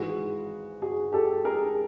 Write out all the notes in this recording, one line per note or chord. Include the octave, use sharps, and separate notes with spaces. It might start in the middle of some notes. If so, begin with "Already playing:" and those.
Already playing: G#1 G#2 E3 F#4 G#4
F#4 G#4
G4 A4
G#4 A#4